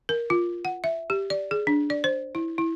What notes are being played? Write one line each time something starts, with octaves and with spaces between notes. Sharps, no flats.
A#4
F4
F#5
E5
G4
D5
G#4
D4
D5
C5
E4
E4